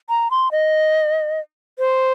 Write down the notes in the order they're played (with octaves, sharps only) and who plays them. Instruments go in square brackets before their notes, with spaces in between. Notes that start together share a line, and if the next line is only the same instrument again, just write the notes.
[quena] A#5
C6
D#5
C5